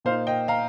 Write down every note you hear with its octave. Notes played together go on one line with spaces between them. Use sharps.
A#2 A#3 D#4 C5 F5
D#5 G5
F5 A#5